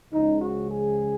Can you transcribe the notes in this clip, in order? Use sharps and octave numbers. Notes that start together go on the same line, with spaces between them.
C#2 C#3 F3 G#3 D#4
F#4
G#4